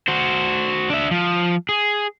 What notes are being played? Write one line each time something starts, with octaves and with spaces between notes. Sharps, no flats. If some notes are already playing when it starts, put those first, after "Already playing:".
F#4 C5
D4 E5
F3
G#4